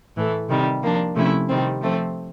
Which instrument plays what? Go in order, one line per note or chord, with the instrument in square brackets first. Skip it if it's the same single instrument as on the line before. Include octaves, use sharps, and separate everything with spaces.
[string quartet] A2 E3 A3
C3 D#3 G3
F3 A#3 D4
C3 F3 A3 C#4 E4
C3 D#3 G3 C4
F3 A3 C4